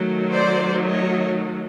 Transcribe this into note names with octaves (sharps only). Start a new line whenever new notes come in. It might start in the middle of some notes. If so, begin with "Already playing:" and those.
Already playing: D#3 F#3 A3
C5 D5
C#5 D#5